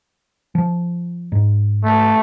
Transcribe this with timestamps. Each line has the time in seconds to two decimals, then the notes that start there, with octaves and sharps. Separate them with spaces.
0.55 F3
1.32 G#2
1.84 A3